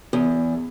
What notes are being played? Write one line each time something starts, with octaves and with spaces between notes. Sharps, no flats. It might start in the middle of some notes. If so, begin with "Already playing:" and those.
E2